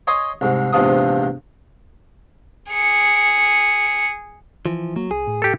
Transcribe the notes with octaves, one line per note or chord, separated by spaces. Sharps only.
C#5 D#5 G#5 C6 D#6
C2 G#2
A#1 E2 G#2 C3 F3 D#6
G#4 C#7
E3 F3
F#3 A#3
C2 G#4
A2
G4 A4